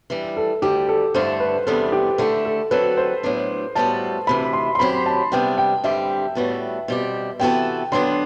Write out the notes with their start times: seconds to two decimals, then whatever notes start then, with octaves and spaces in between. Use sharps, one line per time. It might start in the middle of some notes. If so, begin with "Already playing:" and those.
0.10 E3 G3 D4
0.37 A4
0.62 D2 D3 G3 G4
0.89 A4
1.14 G2 D3 A3 E4 A4 C5
1.40 B4
1.67 E2 C3 G3 B3 D4 A4
1.92 G4
2.18 D3 A3 E4 G4 A4
2.45 A4
2.71 D3 F#3 C4 F#4 A4 B4
2.97 C5
3.23 A2 F#3 B3 D4
3.75 A2 G3 B3 F#4 A4 A5
4.27 D2 C3 E3 B5
4.53 C6
4.75 C6
4.79 F#2 F#3 C4 G4 B5
5.06 A5
5.32 C3 G3 B3 D4 G5
5.58 G5
5.84 G2 D3 G3 C4 G4 E5
6.35 A2 G3 B3 F#4 A4
6.88 B2 G3 C4 G4
7.39 C3 E3 B3 F#4 A4 G5
7.92 D3 F#3 B3 D4 C6